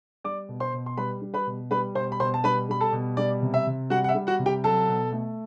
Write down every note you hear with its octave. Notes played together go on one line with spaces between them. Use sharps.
G3 D5 D6
B2
C5 C6
B2
C6
G3 B4 B5
G3
B4 B5
B2
G3 B4 B5
B2 C5 C6
B5
B2 C5 C6
A5
G3 B4 B5
G3 B5
A4 A5
B2
G3 D5
C3
E5
C3
G3 F#4 F#5
F#5
E5
G3
F#4 F#5
C3
G4 G5
F#3 A4 A5
B2
A3